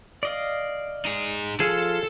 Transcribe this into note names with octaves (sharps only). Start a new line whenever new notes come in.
D5 D#5 F5
D#4 G#4
F3 G#4 A4 F5 A5